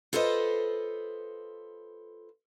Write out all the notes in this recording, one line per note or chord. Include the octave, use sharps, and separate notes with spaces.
F4 A4 B4 C5 D#5